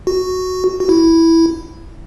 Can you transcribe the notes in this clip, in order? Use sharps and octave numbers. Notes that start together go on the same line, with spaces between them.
F#4
F#4
E4